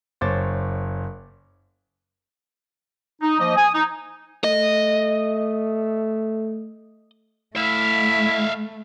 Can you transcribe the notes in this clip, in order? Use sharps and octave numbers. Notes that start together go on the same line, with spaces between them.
F#1 C5 C#5 D6 A6
D#4
F3 A#3 D#5
G#5 D#6
D#4
A3 D#5
A3 E4 E5 F5